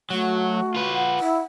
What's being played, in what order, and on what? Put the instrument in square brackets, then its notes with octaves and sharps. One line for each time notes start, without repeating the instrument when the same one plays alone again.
[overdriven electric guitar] F#3 [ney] A3 [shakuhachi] F#4
[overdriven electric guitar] F4 B4
[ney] F#5
[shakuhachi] E4